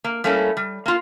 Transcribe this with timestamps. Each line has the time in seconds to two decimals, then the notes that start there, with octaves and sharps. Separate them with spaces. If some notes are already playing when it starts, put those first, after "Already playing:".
0.04 A#3
0.24 G3 A3 A#3 C#4 E4 A4
0.57 G3
0.86 A#3 F4